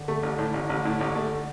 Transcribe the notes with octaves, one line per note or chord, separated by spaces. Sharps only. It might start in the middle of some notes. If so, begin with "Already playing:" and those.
Already playing: D3
A3
A1
A2
A1
A1
A2
A1
A3